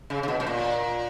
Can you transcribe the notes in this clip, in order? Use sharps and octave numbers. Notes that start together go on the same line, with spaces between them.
C#3
C#3
B2
B2
A#2